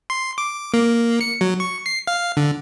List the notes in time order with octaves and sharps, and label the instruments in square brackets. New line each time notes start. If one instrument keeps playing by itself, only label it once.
[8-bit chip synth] C6
D6
A#3
C#7
F#3
C#6
C7
F5
D3